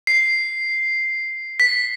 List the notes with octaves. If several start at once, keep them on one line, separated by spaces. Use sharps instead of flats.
C7
B6